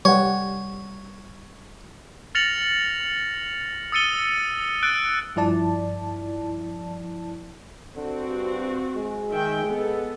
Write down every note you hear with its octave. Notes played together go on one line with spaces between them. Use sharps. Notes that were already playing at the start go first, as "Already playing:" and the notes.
G3 C#5 F#5
F6 A6 A#6 C#7 F7 F#7
D#6 E6 A6 C#7 D#7 G7
E6 F#6 A6 D7
G2 F3 E4 D5 A5
D3 C4 F#4
G2
G#3
D#3 E5 G5
B3 A4